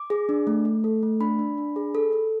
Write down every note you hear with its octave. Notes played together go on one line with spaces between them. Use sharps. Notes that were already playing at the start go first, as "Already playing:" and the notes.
Already playing: D6
G#4
D4
A3
A3
A4
A3
D4 B5
D4
D4
G#4
A4
A4